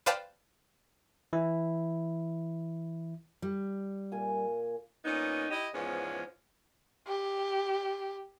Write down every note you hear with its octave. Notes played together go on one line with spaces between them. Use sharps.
B4 C5 D5 F5 G5 A5
E3 E4
G3
A#2 G#5
A#2 B3 C#4 D#4
E4 G4 D#5
E2 G#2 F3 B3 C#4
G4